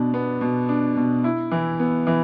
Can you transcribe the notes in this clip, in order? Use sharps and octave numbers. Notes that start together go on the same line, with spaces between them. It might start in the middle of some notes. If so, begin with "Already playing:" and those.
Already playing: B2 D4
B3
B2
D4
B2
E4
E3
B3
E3